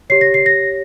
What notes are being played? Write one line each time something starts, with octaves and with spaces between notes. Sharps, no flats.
G4 C#5 C7
A#6
C7
A#6